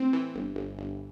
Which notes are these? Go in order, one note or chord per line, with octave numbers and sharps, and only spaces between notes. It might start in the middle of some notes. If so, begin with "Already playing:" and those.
Already playing: A2 C4
E3
G1
G1
G1